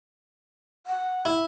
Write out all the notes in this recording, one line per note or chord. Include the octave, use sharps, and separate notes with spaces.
F#5
E4